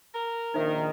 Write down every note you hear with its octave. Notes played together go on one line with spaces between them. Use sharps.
A#4
A#1 D#3 D#4 C5 E5